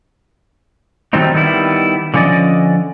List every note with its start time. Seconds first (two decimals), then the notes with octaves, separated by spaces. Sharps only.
1.13 D#3 F#3 G3 A3 C4 D#4
1.35 D#3 G3 B3 E4
2.14 D3 F3 C#4 G4 D5 D#5